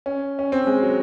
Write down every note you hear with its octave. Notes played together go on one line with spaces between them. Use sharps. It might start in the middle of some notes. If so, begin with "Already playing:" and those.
C#4
C#4
C4
G#3
F#3